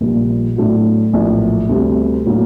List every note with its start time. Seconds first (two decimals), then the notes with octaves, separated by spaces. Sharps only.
0.01 A#1 A#2 G3
0.56 A2 F#3 A3 D4 F#4
1.13 A#1 A2 F#3
1.69 D2 C3 G3
2.26 A2 F#3 A#3 D4